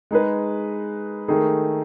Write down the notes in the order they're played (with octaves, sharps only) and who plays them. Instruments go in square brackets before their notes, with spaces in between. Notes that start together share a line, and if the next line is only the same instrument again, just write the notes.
[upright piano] G#3 D#4 G#4 B4
D#3 A3 D#4 G#4